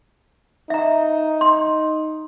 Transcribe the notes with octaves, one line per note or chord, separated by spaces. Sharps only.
D#4 E5 A#5
C6